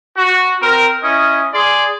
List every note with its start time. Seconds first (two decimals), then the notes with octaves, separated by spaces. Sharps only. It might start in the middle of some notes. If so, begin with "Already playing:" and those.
0.17 F#4
0.61 C4 A#4
1.03 C#4 E4 D#5
1.52 G#4 D5 C6